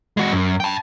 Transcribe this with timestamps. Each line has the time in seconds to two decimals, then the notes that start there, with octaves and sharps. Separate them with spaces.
0.17 G#3 F#4
0.32 F#2
0.60 G5 A5